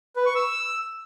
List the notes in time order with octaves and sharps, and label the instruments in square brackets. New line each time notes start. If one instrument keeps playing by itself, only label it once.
[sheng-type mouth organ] B4
C#6
E6